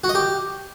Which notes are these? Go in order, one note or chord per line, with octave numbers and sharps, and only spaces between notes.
F#4
D#5
G4